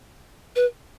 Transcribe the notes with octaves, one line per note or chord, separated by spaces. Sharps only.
B4